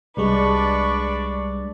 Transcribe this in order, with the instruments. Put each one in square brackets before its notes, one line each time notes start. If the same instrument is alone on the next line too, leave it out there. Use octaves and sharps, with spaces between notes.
[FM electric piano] C2 G3 G#3 [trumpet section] D4 D5 [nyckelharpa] B4 C#6